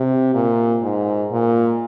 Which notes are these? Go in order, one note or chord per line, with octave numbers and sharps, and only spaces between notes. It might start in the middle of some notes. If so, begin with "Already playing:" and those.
Already playing: C3
A#2
G#2
A#2